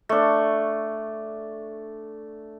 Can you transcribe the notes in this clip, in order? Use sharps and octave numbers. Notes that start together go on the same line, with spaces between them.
A3 D4